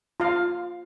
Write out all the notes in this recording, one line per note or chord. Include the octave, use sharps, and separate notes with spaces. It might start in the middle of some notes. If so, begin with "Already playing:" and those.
F4 F5